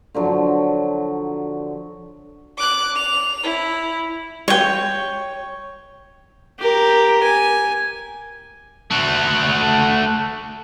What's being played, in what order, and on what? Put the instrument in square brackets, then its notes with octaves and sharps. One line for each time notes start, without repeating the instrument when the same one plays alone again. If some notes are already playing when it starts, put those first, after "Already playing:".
[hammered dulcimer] D3 F3 F#3
[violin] D6 F#6
F7
E4
[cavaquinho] C#5 G5
[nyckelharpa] G4 A#4
G#5
[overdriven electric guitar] A3 F#4